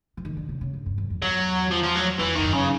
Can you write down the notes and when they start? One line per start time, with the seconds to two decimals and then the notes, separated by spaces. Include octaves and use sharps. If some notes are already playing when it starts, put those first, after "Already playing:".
0.17 E3
0.25 D#3
0.37 D3
0.49 C#3
0.61 C#3
0.73 G#2
0.86 G2
0.98 F#2
1.10 F2
1.22 E2 F#3
1.71 F3
1.83 F3
1.96 F#3
2.20 F2 E3
2.36 G2 D#3
2.44 F#2
2.53 C#3